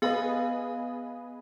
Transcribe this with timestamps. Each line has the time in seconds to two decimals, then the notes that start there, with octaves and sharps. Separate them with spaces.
0.02 B3 G#4 B4 D#5 F5